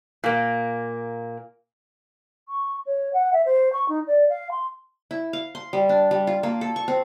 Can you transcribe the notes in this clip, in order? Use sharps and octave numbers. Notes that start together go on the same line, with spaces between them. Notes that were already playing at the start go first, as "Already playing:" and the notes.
A#2 A#3
C#6
C#5
F#5
E5
C5
C#6
D#4
D5
F5
C6
E4
F5
C6
G3
D4
G3
F4
A#3
A4
C#6
C4